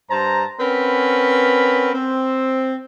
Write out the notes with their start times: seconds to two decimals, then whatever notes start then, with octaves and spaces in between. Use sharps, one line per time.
0.10 G2 C5 A5 A#5
0.59 C4 C#4 A#4 B4 F#5 B5
1.94 C4